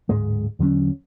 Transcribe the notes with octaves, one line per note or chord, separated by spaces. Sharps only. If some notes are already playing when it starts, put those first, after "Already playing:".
D1 G#2 G#3
E2 D3 F#3 C#4